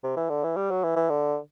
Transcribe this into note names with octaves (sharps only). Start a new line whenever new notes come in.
C3
E3
D3
E3
G3
F#3
E3
E3
D3